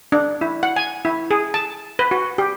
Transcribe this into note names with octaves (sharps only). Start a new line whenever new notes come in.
D4
E4
F#5
G#5
E4
G#4
A5
B4
F#4
G4